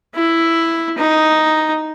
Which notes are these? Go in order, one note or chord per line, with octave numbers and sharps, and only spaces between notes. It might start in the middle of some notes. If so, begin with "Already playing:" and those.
E4
D#4